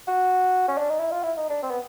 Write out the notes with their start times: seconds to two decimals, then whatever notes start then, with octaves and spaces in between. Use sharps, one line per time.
0.08 F#4
0.68 C#4
0.78 D4
0.90 D#4
0.99 E4
1.11 F4
1.23 E4
1.37 D#4
1.50 D4
1.63 C4
1.71 B3